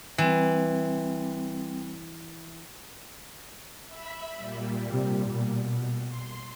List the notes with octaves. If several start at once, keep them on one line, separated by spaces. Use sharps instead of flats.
E3 G3 C4
E5 B5
A#2 G3
C3
B2
C6